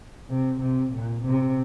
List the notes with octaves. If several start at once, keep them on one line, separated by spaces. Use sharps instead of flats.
C3
C3
A#2
C3